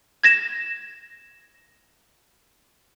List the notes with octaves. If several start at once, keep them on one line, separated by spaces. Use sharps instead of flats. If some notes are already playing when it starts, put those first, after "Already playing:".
G#6 A#6 E7